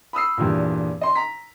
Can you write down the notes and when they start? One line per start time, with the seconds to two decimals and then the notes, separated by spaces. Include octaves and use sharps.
0.13 B5 D#6 E6 C7
0.37 E2 G2 A#2
1.01 D#5 C6
1.15 A#5 B6